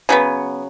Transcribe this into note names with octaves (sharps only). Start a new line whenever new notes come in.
C#3 F#3 B3